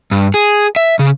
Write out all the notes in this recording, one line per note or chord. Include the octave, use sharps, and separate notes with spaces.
G2
G#4
E5
C#3